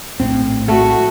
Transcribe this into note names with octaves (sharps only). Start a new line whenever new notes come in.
A#1 A2 C4
A3 F#4